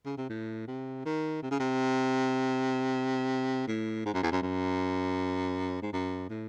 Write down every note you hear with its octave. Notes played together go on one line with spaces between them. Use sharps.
C#3
C3
A2
C3
D#3
C3
C#3
C3
A2
G#2
F#2
E2
F#2
F#2
G#2
F#2
A2